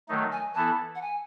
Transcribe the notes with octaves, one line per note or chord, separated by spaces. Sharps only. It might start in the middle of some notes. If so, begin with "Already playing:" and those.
D#3 F#3 A3 D#4
G#5
E3 B3 E4 A4 A5
F#5
G#5